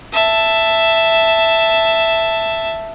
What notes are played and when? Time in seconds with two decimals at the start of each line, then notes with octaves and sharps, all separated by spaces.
0.13 E5 A5